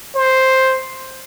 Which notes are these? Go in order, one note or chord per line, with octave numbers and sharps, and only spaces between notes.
C5